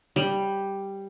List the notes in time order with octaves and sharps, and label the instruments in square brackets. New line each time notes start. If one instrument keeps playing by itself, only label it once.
[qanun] G3